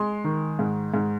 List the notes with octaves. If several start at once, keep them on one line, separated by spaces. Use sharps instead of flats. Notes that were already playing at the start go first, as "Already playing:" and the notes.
Already playing: G#3 C6
D#3
G#2
G#2